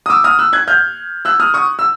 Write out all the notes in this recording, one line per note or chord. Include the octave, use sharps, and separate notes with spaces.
D#6
D6 E6
D#6 F6
E6 F#6
F#6 G#6
F6 G6
E6 F#6
D#6 F6
C#6 D#6
E6